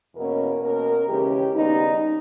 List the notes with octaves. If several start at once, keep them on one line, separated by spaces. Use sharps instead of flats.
E2 B2 A#3 C#4 A#4
B2 A#3 C#4 A#4
D#2 C#3 E3 G#3 C#4 G4
D#2 C#3 G3 B3 D#4